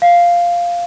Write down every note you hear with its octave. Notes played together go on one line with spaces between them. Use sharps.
F5